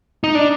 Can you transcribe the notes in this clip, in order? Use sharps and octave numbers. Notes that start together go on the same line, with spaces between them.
D#4
D4